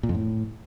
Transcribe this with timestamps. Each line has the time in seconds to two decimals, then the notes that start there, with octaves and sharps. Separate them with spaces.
0.03 A#2
0.09 F2
0.15 A2